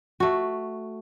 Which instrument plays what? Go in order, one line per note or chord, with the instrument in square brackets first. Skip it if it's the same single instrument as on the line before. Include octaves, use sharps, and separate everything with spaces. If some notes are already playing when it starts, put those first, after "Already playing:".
[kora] A3 F#4